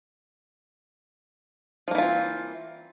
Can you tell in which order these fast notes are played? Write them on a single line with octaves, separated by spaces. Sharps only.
F3 A#3 E3 F4 C4